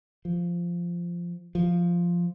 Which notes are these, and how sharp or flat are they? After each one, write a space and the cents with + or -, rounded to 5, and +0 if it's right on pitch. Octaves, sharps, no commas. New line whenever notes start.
F3 -10
F3 -5